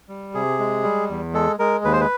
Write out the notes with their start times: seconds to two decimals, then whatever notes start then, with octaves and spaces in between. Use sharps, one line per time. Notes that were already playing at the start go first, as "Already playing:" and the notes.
0.08 G3
0.34 C3 G#4
0.59 G#3
0.84 G3
1.09 E2
1.34 G#3 A4
1.59 G#3 A#4
1.84 D#2 B4
1.93 C5
2.01 B4